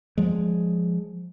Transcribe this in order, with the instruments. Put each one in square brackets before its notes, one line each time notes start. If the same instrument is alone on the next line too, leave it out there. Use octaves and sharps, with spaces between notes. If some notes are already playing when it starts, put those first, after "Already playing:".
[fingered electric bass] F3 G#3